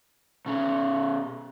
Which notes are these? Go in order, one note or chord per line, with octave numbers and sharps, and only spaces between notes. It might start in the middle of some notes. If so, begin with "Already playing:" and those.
B2 C#4